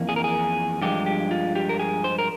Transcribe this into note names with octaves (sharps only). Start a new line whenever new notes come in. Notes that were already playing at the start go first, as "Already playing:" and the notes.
Already playing: F2 E3 A#3
G#4
A#4
G#4
G2 F3 G#3 G4
G4
F4
G4
A#4
G#4
C5
A#4